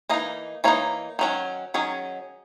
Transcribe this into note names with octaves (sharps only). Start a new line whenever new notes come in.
E3 A#3 D#4 D#5
E3 A#3 D#4 C#5
D#3 F#3 C#4
D#3 F#3 C#4 G#4